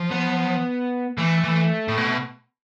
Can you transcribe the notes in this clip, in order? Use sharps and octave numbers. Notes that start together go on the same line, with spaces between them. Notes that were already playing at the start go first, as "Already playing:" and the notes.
Already playing: F3
B3
E3 A3
E3
A2
B2